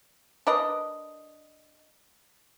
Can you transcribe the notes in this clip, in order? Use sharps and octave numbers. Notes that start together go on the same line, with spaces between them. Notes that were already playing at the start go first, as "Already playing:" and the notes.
D4 A#4 B4 D#5